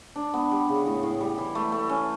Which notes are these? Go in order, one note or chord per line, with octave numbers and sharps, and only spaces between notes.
D4
B3
G3
C#3
A2
A2
G3
E3
A3
A3
C#4